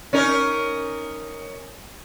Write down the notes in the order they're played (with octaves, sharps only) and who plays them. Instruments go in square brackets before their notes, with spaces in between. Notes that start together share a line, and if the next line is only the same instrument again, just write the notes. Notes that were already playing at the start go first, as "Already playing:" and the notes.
[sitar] C#4 D#4 A#4